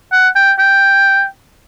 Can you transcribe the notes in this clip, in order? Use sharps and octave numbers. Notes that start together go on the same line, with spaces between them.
F#5
G5
G5